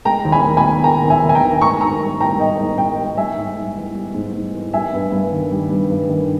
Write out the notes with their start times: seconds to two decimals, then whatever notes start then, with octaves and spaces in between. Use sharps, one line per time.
0.05 G#3 G5 A#5
0.25 D#2
0.32 G#5 B5
0.44 D#2
0.57 G#5 B5
0.64 D#3
0.84 G#3 G5 A#5
1.04 D#2
1.10 E5 G#5
1.23 D#2
1.29 G#5
1.35 G5 A#5
1.42 D#3
1.62 G#2 A#5 C#6
1.81 G#2 A#5 C#6
2.01 G3
2.19 G3 G5 A#5
2.40 G#2 D#5 G5
2.59 G#2
2.78 G3 D#5 G5
2.98 G3
3.17 G3 E5 G#5
3.36 G#2
3.57 G#2
3.76 E3
3.95 G3
4.14 G#2
4.34 G#2
4.54 E3
4.73 G3 E5 G#5
4.93 G2
5.12 G2
5.32 D#3
5.51 G3
5.70 G2
5.90 G2
6.09 D#3